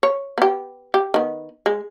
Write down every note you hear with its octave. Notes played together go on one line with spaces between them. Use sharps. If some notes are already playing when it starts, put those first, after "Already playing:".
C#5
B3 G4
G4
D#3 B3
G#3